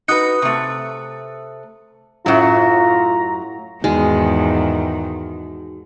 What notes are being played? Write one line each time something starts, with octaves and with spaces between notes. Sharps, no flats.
D#4 F#4 B4 D#6 F#6 C#7
C3 A3
F#2 A2 F#3 F4 A#5
E2 G#2 D#3 G#3 D#4 F#4